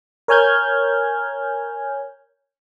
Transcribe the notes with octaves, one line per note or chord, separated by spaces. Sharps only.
A#4 C#5 G#5 F6 G6 G#6